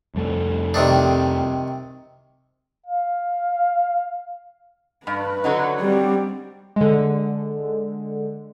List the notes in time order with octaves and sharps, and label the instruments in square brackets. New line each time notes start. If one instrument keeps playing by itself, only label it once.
[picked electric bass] C2 F2 A3
[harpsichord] C3 D#3 D4
[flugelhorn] F5
[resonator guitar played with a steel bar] G2 [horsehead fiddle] B4
[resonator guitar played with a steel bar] D3 F#3 D#4
[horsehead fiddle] G3 C4
[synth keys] D3 G#3